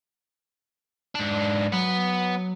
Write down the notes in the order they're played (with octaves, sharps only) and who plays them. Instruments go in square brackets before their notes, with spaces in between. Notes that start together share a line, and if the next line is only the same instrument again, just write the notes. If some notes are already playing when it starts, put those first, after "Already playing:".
[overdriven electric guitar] G#2 D4
[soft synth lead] F#3 [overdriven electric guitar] B3